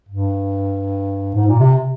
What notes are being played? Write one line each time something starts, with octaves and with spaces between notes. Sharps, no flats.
G2
G#2
A#2
C3